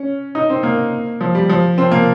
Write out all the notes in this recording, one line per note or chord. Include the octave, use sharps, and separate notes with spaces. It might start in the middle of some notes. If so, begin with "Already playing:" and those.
Already playing: C#4
D#4
C4
A#3
F3
G3
F3
C4
A#3